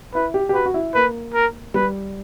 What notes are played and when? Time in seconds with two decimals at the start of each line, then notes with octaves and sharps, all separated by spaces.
0.14 E4 B4
0.34 G4
0.49 G4
0.54 F#4 B4
0.66 F#4
0.74 E4
0.94 A#3 B4
1.34 A#4
1.74 G3 B4